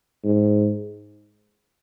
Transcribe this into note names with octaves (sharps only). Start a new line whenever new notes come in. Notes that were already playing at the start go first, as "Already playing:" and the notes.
G#2